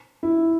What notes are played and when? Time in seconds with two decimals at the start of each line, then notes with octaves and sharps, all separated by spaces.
0.23 E4